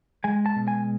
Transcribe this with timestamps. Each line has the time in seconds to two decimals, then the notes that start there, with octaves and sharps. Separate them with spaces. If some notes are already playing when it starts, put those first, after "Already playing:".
0.24 G#3 G#5
0.46 A5
0.56 B2
0.68 G#5